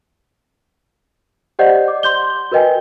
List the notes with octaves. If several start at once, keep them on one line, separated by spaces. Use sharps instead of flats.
G4 C5 D5 D#5 F#5 G6
D6
C6 G6 G7
F#4 A#4 B4 D#5 G5 G#5